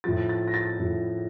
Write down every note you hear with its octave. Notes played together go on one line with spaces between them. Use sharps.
A2 F3 A6
A6
A#6
A6
A2 F3